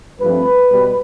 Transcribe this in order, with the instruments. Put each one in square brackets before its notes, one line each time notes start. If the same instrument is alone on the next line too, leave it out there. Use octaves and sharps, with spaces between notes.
[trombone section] G2 F3 A3 C4 B4
B2 G3